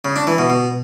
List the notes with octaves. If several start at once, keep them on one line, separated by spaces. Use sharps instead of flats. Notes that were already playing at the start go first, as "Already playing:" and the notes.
C#3
D4
E3
B2
B2